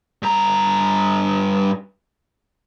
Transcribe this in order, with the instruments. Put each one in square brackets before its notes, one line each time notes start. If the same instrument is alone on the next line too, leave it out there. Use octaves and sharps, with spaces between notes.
[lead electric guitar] G2 A#5